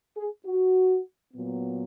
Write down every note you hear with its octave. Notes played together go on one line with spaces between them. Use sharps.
G#4
F#4
A#2 F#3 B3